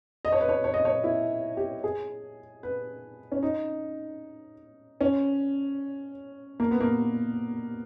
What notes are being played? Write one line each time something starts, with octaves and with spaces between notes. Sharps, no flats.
D#5
C#5
B4
C#5
C#5
D#5
C#5
E4
G4
G#4
B4
C#4
D#4
C#4
A#3
B3
A#3